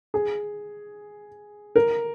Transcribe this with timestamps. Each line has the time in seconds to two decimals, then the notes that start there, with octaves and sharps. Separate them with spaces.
0.14 G#4
1.76 A#4